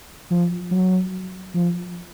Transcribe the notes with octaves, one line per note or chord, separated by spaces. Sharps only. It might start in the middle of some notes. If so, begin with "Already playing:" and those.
F3
F#3
F3